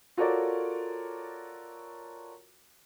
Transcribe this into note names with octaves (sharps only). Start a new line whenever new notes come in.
F4 F#4 A4 A#4 C#5 D5